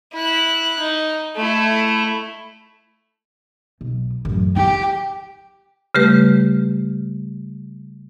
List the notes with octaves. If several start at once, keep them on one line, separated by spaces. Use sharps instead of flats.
E4 F#6
D#4
A3 E4
B1
A1 F#2
E4 G4
C#3 G3 A3 G4 B4